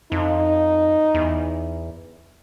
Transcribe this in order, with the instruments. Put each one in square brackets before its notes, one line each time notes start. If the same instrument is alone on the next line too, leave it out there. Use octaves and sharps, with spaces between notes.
[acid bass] F2 [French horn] D#4
[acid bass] E2